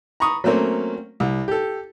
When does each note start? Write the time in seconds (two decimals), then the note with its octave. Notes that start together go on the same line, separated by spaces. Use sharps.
0.20 A#5 B5 C#6 D#6
0.44 F#3 A3 A#3 C4 C#4
1.20 C2
1.48 G4 A4